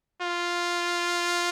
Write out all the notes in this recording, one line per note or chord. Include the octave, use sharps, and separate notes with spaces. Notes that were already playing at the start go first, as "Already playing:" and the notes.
F4